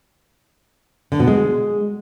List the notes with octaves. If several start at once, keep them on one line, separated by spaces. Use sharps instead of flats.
D3
B2
G#3